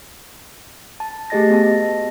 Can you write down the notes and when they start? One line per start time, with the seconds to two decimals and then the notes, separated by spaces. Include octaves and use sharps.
1.00 A5
1.30 A3 G4 G#4 D#5 A6 A#6
1.50 B3 F#4 D#5 A5 A#6